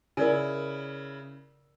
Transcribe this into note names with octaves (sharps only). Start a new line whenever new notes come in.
C#3 E4 A#4 D5 G#5